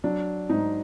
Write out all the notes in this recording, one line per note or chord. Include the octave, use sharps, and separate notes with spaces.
F#3 D4
G#2 D#4